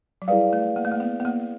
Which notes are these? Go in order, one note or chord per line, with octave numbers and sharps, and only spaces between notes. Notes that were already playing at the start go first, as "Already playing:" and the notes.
F#3
G3 E4 G#4 B4 D5 F5
A3
A#3
A3
A#3
B3
B3
A#3